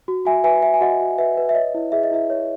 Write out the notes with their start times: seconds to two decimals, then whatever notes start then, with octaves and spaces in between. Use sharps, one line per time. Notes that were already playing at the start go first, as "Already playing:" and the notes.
0.08 F#4
0.25 F#4 E5 G#5
0.44 B4 E5 G#5
0.62 B4 E5 G#5
0.74 G#5
0.81 F#4 D#5 F#5
1.01 F#4
1.18 B4 E5
1.37 B4
1.49 E5
1.55 C#5 D#5
1.74 E4
1.92 G#4 E5
2.03 D#5
2.12 E4 E5
2.30 C#5